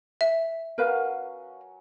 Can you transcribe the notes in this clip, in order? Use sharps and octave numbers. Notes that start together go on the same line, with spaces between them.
E5
F#3 C#4 A#4 B4 F5